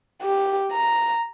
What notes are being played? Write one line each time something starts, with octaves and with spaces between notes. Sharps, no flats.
G4
A#5